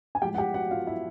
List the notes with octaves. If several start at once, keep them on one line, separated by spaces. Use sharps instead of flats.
G#5
A2 F3 G#3 G4 G5
F#5
G4 G5
F#4 F#5
F4 F5
E4 E5